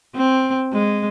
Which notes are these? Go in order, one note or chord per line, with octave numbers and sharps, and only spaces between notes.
C4
G#3